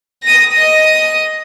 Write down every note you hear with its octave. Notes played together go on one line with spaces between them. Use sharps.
D#6 A#6
D#5 D#6